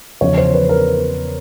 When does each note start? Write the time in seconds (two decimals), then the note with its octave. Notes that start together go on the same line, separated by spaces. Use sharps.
0.21 E2 C#3 F3 C#5
0.38 C5
0.54 B4
0.69 A#4